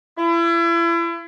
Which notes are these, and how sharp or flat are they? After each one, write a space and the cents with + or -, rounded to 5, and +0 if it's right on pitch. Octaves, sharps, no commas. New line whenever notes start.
E4 +35